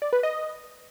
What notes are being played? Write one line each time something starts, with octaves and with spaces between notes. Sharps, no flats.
D5
B4
D#5